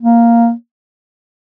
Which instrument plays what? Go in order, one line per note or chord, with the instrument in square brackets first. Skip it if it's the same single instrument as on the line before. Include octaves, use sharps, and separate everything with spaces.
[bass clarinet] A#3